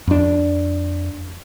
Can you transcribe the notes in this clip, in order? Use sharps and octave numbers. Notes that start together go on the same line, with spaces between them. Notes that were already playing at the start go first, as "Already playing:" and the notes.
F2 D4